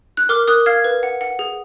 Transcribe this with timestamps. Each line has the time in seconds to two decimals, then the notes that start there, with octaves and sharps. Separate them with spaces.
0.17 F#6
0.29 A#4 D6 F6
0.48 A#4 D#6 F#6
0.66 F5 F6 G#6
0.84 B4
1.03 F#5
1.21 F#5
1.39 G#4